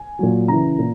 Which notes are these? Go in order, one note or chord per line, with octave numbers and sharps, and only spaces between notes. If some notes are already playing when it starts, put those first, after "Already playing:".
Already playing: G#5
A#2 F#3
C#3 E3 A#5
A#2